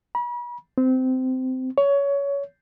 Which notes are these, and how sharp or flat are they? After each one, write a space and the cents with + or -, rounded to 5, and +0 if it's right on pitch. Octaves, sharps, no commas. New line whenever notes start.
B5 -40
C4 -20
C#5 +20